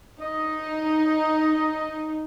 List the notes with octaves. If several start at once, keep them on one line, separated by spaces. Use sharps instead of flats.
D#4 D#5